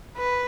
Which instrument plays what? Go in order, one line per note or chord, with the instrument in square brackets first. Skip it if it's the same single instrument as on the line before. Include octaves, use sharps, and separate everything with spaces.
[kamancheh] B4